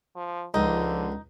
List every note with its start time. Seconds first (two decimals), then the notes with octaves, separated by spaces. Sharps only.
0.16 F3
0.54 C#2 D3 F3 D#4